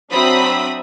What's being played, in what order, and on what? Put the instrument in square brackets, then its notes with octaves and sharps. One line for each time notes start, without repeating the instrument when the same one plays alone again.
[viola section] F#3 D4 E5 [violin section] C4 B5 D#6